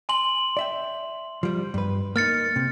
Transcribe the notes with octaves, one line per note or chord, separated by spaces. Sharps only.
G#5 C6 F#7
D5 E5 G5
F3 G3
G2 B4
A#3 D#4 F6 A6 C#7
C3